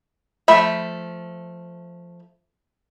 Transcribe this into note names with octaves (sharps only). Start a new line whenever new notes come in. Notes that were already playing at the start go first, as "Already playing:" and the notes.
F3 A3 E5 B5